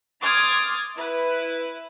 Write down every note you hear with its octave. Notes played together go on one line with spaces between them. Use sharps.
C6 D6 D#6 F6 G#6 A6
E4 B4